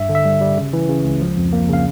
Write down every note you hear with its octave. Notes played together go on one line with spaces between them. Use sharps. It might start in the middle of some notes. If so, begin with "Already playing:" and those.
Already playing: G2 E5
D3
E5
G3
G3
C#3
E3
C#3
C#2
F3
F2
A#3
C#3 F5